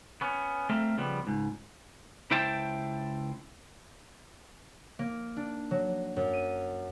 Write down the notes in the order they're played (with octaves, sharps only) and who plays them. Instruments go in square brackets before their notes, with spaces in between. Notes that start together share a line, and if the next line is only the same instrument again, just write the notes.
[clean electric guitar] B3 C#4
A3 C4 A4 A#4 E5 F5
C#3 F3 G3 B3
C#2 G#2
C#2 E4 C5 G5 A5
[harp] A#3
D4
F#3
F#2
D#7